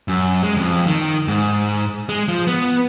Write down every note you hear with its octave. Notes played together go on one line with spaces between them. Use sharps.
F#2
G#3
F2
D#3
G#2
G#3
F3
B3